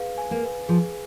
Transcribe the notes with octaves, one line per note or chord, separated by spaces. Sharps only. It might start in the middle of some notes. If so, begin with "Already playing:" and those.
Already playing: G#4 B4 F5
G#5
A#3
B4
F3 G#4